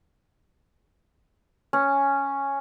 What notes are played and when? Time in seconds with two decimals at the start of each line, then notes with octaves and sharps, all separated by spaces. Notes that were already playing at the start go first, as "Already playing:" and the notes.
1.73 C#4